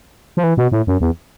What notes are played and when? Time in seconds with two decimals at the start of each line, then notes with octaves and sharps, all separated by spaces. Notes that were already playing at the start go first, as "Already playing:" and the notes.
0.37 F3
0.44 E3
0.57 B2
0.72 A2
0.87 F#2
1.01 E2